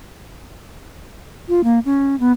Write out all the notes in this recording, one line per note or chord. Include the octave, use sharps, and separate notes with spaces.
F4
A#3
C#4
B3